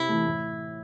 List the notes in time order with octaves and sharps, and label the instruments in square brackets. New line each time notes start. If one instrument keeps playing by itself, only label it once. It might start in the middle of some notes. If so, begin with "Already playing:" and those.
Already playing: [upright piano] C3 [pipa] E4
[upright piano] E3 A3
A2